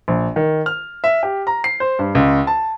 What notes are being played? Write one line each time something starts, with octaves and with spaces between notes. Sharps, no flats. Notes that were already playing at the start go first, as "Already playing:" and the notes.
A#1
D#3
F6
E5
G4
A#5
C7
C5
G2
C#2
A5